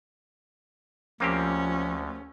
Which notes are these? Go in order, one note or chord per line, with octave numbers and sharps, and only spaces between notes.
D2 F3 A#3 C4 C#4 G4